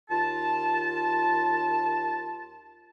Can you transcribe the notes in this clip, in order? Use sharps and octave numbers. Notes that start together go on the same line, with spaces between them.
D#2 F4 A5